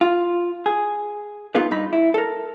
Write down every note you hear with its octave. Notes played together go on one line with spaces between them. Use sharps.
F4
G#4
B3 D#4 F4 G#4 B4
G2 D#4 B5
E4
A4 A#4